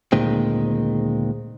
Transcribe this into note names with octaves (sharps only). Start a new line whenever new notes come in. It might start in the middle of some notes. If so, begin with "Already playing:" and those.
D2 A#2 D#3 G#3 C4